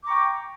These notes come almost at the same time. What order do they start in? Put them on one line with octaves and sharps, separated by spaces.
D6 A#5 C#6 G5